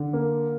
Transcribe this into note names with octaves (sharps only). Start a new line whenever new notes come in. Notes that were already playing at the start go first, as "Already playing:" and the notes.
Already playing: D3
A#3